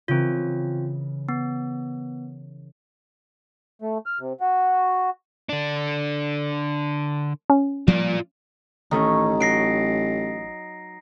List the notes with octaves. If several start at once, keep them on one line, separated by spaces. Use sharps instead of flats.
C#3 E3 C4 F4 A#4
B3
A3
F6
C3
F#4
D3 D4
C#4
F3 G3 A#3 F4 D5
A1 D#3 A3 C#4 D#4
F#3 A#6 C7 D7